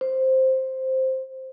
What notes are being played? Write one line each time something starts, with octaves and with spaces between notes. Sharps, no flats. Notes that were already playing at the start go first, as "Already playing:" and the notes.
C5